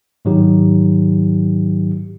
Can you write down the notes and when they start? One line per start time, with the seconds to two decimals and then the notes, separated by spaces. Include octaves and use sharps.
0.25 G#2 D#3 F#3 D#4 G4